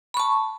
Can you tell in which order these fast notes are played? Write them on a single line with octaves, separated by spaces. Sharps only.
B5 C#6 A5